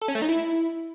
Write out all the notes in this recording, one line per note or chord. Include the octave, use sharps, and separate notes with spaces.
A4
C#4
A3
D#4
E4